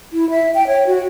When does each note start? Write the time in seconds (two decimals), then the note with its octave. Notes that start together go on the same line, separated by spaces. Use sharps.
0.13 E4
0.30 E5
0.55 G5
0.67 C#5
0.87 F#4